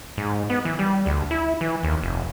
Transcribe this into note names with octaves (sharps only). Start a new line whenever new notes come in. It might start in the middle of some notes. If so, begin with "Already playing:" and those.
G#2
B3
E3
G3
D2
E4
E3
D#2
F1